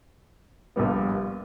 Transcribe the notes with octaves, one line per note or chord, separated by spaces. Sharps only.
A#1 A#2 G3 B3